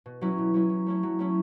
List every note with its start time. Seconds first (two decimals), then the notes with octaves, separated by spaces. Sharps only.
0.06 B2
0.21 F#3 C#4 E4
0.38 B2
0.54 F#3 C#4 E4
0.70 F#3
0.86 A3 C#4 E4
1.03 F#3
1.19 A3 C#4 E4